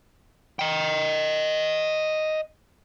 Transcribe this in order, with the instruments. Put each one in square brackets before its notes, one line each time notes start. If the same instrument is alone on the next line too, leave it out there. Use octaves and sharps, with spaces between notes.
[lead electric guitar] D#5 G5